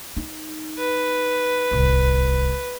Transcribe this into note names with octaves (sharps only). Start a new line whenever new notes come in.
D#4
B4
D1 C2